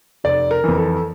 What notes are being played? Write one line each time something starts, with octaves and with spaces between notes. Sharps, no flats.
F1 D5
A#4
F2 E3
A4